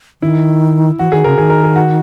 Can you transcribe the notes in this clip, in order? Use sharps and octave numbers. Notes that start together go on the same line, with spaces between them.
D#3 E4
E3 F#4
D#3 G#4
C#3 A#4
D#3 G#4
A#4
G#4
F#4